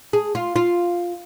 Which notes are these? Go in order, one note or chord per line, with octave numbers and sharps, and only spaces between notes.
G#4
F4
F4